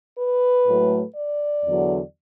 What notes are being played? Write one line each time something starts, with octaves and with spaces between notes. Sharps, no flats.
B4
A2 F#3 A3
D5
E2 D3 F#3